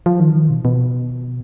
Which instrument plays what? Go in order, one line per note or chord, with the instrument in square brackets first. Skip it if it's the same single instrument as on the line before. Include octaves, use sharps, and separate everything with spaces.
[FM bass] F3
D#3
F3
D#3
B2
B2